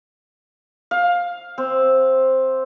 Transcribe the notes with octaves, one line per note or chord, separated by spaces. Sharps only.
F5
C4